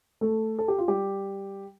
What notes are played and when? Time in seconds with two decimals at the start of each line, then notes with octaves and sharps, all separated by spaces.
0.21 A3 A4
0.59 A4
0.68 G4
0.78 F4
0.88 G3 G4